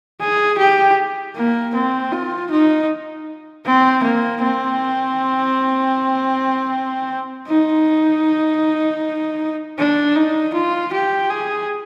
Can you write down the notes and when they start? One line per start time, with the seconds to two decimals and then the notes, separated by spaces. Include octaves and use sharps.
0.20 G#4
0.58 G4
1.35 A#3
1.74 C4
2.12 F4
2.51 D#4
3.66 C4
4.04 A#3
4.42 C4
7.47 D#4
9.78 D4
10.16 D#4
10.54 F4
10.93 G4
11.30 G#4